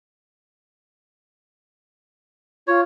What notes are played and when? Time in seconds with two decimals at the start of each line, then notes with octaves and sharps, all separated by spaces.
2.68 F4 C#5